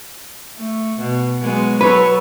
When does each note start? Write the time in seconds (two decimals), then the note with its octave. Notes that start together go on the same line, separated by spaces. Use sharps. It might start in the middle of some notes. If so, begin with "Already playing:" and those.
0.57 A3
0.99 B2
1.42 F#3 G#3 B3
1.81 F#3 A4 B4 C#5